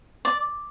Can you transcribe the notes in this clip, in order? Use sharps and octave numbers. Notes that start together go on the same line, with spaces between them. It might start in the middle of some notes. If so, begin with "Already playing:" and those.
D5